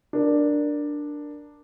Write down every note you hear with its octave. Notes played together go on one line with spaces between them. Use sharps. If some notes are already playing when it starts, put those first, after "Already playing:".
D4 A#4